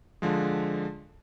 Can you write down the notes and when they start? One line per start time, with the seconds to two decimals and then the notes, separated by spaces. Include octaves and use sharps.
0.22 D3 F3 G#3